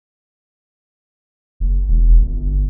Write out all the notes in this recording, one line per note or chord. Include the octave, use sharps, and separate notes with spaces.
F#1
E1
G1